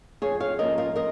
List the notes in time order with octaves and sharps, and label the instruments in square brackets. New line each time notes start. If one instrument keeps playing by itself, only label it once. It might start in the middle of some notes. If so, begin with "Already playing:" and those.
[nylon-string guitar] F2 G#4 C#5
C#5 F5
F3 A#3 C#4 A#4 D#5
F4 A#4
A#4 D#5